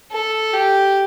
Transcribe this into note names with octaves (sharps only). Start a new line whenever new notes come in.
A4
G4